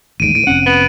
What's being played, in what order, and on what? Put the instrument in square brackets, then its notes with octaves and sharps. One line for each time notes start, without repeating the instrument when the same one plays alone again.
[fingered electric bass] A1 D#2 G#2 [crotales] D7 D#7
[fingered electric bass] A2 [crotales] D7
[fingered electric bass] F1 C4 C#4 [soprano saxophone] F#5
[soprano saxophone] B3